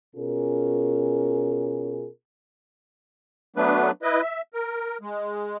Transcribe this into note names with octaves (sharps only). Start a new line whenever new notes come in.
B2 C#4 F4 G#4 A#4
F#3 A3 B3 D4 B4
E4 B4 D#5
E5
A#4
G#3